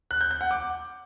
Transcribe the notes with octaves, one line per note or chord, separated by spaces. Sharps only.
F#6
G6
G6
F#5
D6